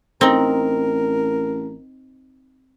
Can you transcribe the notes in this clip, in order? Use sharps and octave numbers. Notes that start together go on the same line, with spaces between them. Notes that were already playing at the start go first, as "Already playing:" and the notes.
A1 C4 D#4 A#4